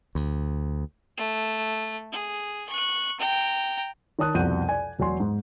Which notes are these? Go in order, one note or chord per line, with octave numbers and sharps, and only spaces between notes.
D2
A3
G#4
C#6 F#6
G5 A#5
D#3 C#5 A5 D#6 F#6
C2 F2 B2 F#5 G6 D#7
D5 G#5
E1 F#3 D5 G#5 C6
G#2